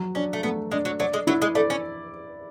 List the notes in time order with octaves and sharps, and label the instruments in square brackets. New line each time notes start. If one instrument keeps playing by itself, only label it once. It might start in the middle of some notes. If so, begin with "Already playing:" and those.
Already playing: [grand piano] F#3
[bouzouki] C#4 [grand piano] D4
[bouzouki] A3
[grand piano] A3 [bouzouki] B3
[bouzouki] G#3 [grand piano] D4
[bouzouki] F#3
[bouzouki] F#3 [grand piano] D5
[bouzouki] G#3
[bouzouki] F#3 [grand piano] E4
[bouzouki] G#3
[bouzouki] A3 [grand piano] D5
[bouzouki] C#4